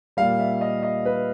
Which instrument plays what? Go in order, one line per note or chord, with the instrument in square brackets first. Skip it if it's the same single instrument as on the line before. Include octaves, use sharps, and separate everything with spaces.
[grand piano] A#2 G3 F5
E5
D#5
D#5
B4